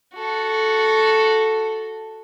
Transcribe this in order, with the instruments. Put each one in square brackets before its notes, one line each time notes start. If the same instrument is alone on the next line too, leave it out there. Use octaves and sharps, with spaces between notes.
[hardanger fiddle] F#4 A4